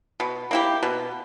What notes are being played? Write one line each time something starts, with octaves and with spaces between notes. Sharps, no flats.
B2
A#3 E4 G4
B2